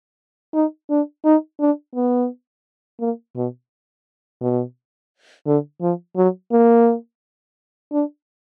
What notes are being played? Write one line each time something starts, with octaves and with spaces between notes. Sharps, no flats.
D#4
D4
D#4
D4
B3
A#3
B2
B2
D3
F3
F#3
A#3
D4